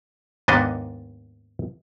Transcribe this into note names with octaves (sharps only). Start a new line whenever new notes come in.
D#2 G#2 A#3 B3 D4 D#5